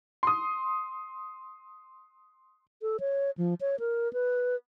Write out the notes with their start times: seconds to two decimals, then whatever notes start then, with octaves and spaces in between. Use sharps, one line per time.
0.23 C6 D#6
2.82 A4
3.00 C#5
3.37 F3
3.61 C#5
3.80 A#4
4.13 B4